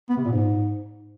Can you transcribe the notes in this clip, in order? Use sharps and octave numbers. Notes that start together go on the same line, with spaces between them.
B3
C3
A#2
G#2